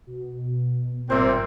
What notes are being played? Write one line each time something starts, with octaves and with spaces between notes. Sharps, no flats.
B2
G#1 A#2 G3 C4 C5 E5